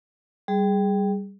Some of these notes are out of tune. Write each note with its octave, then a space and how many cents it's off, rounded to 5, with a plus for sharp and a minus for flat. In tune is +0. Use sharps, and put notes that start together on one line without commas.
G3 +0 G#4 +0